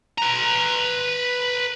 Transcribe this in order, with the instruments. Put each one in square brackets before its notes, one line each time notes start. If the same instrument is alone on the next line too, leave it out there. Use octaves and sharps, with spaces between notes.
[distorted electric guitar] B4 A#5